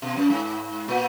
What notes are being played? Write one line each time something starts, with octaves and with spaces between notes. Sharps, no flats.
B2
F#2
G#2
A#2